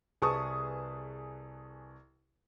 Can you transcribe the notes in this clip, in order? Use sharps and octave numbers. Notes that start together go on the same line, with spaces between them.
C2 G#4 B4 A5 C#6 D#6